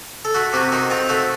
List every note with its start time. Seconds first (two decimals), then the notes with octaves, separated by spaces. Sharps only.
0.25 A4
0.35 A3 F#4
0.53 C3 F#4
0.72 D#3 F#4
0.90 C4 F4
1.09 A3 F#4